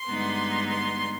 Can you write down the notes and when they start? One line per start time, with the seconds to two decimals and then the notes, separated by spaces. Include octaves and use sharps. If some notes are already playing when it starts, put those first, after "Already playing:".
Already playing: C6
0.08 G2 D3 G#3 B3 D#4
0.69 C6